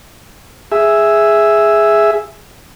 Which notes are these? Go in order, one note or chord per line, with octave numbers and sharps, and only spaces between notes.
G#4 E5